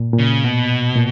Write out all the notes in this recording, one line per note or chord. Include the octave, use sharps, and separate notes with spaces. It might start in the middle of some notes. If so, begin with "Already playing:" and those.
Already playing: A#2
A#2 C#3
B2
A#2